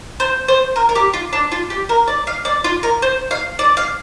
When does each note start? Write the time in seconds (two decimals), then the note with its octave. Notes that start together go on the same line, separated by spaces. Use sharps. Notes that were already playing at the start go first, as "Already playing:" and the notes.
0.20 C5
0.48 C5
0.76 A#4
0.89 A#4
0.95 G4
1.14 F4
1.33 D4
1.52 F4
1.70 G4
1.89 A#4
2.08 D5
2.27 F5
2.45 D5
2.64 F4
2.83 A#4
3.02 C5
3.31 F5
3.59 D5
3.77 F5